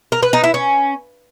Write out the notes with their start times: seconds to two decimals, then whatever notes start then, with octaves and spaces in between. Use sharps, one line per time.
0.12 A#4
0.23 B4
0.33 D#4
0.44 E4
0.54 C#4